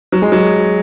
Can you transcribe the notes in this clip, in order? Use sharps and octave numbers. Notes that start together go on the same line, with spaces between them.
F#3
G#3
F#3